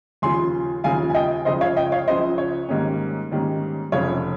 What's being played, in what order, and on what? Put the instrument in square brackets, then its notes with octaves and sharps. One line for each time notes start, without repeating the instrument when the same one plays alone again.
[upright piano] D#2 C#3 F3 G#5 C6
D#2 C#3 F3 F5 G#5
G#5
D#5 G5
C#2 C#3 F3 C5 D#5
C#5 F5
D#5 G5
C#5 F5
C#2 C#3 F3 C5 D#5
C#5
G#2 D#3 G3 A#3 C#4
G#2 D#3 G3 A#3 C#4
F1 F2 C#3 C#5 F5